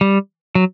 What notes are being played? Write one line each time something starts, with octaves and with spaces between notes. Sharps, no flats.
G3
F#3